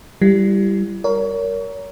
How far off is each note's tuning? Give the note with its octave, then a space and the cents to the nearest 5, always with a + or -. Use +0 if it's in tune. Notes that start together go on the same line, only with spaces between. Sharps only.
G3 +0 E4 +35
A#4 +0 C#5 +30